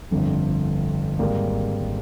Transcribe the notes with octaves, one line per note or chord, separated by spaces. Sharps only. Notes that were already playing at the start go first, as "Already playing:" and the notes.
G1 F2 D3
G#1 G#2 G3 A#3